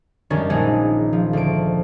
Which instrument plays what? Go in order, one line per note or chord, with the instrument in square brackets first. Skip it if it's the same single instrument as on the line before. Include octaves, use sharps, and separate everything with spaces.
[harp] F#2 D#3 G3 G#3 C#4 D4
A#1 G#3 D#4 G#4
F3
D2 D7